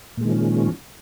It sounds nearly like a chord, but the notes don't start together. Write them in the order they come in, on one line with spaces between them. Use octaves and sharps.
A#2 G#3 D#3 F3 C#4